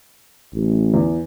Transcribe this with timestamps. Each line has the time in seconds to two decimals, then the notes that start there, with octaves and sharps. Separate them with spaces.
0.53 A1
0.94 E2